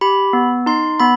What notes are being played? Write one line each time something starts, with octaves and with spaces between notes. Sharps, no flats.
G4 B5
B3
D#4 C6
B3 B5